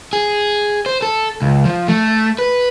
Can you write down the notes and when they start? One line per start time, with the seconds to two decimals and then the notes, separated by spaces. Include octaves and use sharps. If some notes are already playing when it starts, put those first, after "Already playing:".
0.13 G#4
0.86 C5
1.02 A4
1.42 C#2
1.65 F3
1.88 A3
2.39 B4